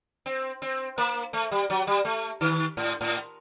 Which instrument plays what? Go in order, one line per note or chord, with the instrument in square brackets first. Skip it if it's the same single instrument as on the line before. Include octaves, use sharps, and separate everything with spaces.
[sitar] C4
C4
A#3
A3
G3
F#3
G3
A3
D#3
A2
A2